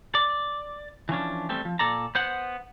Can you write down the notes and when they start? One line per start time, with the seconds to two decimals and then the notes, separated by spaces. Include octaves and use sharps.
0.15 D5
1.09 E3 F3 C#4 D4
1.49 G3 A3 C4
1.65 F3
1.79 A#2 A4 D5 A#5
2.15 B3 C5 F#5